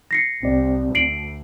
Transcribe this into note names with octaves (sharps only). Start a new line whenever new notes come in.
A#6 C7 C#7
C2 C4 D5
D2 C7 D7 F#7